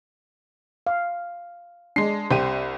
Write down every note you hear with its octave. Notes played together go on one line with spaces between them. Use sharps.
F5
G#3 D4 C7
C2 G4 C5 D#7